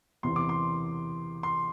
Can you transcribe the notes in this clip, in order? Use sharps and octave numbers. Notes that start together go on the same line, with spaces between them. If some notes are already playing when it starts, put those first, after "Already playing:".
E2 C3 E3 C6
D6
C6
C6